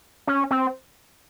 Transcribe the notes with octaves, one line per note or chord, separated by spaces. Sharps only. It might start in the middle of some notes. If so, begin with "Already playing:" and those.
C#4
C4